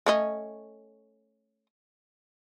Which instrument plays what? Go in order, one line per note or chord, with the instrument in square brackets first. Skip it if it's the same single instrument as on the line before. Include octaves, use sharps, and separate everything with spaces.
[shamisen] A3 C#4 D#5